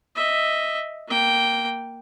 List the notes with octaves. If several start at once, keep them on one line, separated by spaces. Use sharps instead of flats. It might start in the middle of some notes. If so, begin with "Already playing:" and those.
D#5 E5
A#3 G5